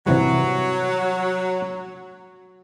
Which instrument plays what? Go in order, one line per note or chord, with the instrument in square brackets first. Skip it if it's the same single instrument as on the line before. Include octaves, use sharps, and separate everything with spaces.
[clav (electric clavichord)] C3 E3 G3 [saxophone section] F#3